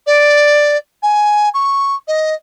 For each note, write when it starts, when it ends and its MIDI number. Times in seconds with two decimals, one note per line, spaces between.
0.07 0.77 74
1.03 1.49 80
1.54 1.96 85
2.08 2.34 75